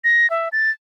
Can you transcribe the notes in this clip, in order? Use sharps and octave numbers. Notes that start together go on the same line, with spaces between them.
A#6
E5
A6